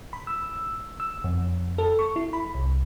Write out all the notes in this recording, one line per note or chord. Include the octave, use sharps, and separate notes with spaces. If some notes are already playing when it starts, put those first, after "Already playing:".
B5
E6
E6
F2
A4
C#6
E4
B5
C2